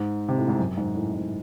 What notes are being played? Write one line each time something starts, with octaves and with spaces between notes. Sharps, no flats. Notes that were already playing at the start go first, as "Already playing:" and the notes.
Already playing: G#2
C3
A2
G#2
F#2
G#2
A2
G#2